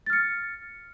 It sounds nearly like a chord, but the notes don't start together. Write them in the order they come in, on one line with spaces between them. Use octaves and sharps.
A6 F6 C#7